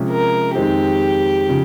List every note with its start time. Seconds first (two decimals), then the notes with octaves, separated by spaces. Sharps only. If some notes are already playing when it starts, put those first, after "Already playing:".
Already playing: C3 F3 G#3 C#4 G#4
0.09 A#4
0.55 F2 D#3 G#3 C4 D#4 G4
1.48 C#3 F3